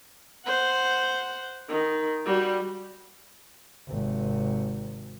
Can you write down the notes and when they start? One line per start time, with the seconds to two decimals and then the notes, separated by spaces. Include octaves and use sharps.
0.46 C5 F#5
1.69 D#3
2.26 G3 F#4
3.89 G#1 C3